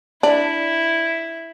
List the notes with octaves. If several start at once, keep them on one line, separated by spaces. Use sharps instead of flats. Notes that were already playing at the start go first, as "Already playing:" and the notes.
D4 E4